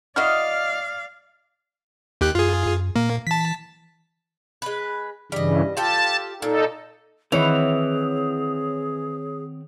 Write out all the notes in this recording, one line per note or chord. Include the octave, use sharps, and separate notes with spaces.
E4 F#4 D5 D#5 F5 F6
D#2 G4 F#6
F#2 F4 G#4
F#2
A#2 A#3
E3 A5 B6
G#3 B4
G2 C#3 E3 G3 D#5
F4 G4 A4 A5
A#2 D#4 A4
D#3 E3 C4 G#4 C#5 F#5 F7